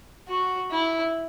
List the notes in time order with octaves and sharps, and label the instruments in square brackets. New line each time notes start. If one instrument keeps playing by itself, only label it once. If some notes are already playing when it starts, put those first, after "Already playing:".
[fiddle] F#4
E4